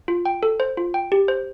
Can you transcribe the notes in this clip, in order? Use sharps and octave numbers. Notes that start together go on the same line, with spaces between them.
F4
G5
A4
C5
F4
G5
G4
C5